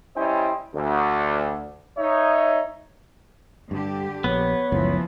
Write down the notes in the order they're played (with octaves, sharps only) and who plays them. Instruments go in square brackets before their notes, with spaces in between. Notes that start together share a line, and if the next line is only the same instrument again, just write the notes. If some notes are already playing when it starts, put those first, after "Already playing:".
[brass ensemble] G3 C#4 E4 C5 D#5 G5
D2
D#4 C#5 E5
[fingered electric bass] G2 [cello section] D3 G4
[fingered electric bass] A#1 [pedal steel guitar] B3 [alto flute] C#5
[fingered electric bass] F#1 C#2 F#2 [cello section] E3 F3